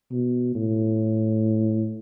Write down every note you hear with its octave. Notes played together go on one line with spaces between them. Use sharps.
B2
A2